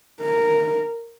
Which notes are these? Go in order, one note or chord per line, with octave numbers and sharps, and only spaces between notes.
A#4